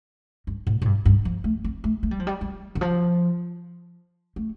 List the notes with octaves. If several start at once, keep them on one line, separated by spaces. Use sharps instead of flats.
G2
A2
A2
G2
G2
F3
A3
C4
A3
A3
G3
F3
G3
G3
D3
F3
A3